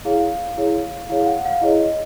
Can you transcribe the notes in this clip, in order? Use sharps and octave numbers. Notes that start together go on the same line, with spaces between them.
E4 G#4 C#5 F5
E4 G#4 C#5
E4 G#4 C#5 F5
F5
F#5
F5
E4 G#4 C#5 D#5
D#5